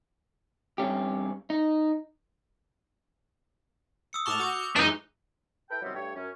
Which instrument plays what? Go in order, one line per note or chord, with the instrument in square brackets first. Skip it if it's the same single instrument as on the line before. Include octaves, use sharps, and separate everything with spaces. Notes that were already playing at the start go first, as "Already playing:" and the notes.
[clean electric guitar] G2 C4 C#4 G4
D#4
[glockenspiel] D#6 E6 C#7
[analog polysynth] A2 A5 F6 [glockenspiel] C#6 D6 F7
[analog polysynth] F#4 G6 C#7 [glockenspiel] D#6 F7
[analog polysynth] F#2 E3 G#3 [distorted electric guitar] D4 D#4 [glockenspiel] F#6
[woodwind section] E4 A4 B4 G5
C3 D#3 F#3 G3 B3 C4
G2 A3 G4 C#5
F#2 C#4